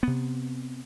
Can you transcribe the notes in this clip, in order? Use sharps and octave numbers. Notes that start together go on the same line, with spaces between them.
C3 B3